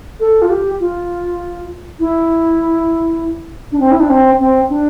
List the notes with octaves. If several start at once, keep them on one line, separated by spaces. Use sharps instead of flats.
A4
F4
G4
F4
E4
D4
C4
E4
D4
C4
C4
D4